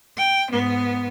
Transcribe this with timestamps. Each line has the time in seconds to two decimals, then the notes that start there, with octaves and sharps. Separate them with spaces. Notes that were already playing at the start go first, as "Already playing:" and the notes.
0.17 G5
0.51 G#2 B3